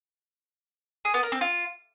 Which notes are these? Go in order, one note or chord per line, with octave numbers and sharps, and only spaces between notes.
G#4
B3
A#4
C4
F4